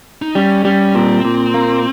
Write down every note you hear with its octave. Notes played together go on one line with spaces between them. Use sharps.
D#4
G3 C#4
G3 C#4
A#2 C4
A#2
A#3